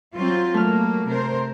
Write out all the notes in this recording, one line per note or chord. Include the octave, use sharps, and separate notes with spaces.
F#3 C4 F4
F#3 A3 A#3 F6
C3 A#4 C5